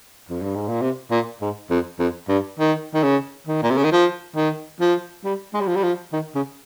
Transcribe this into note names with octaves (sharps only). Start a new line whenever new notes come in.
F2
G2
G#2
A#2
C3
A#2
G#2
F2
F2
G2
D#3
D#3
C#3
D#3
A#2
C3
C#3
D#3
F3
D#3
F3
G3
G#3
G3
F3
G3
F3
D#3
C#3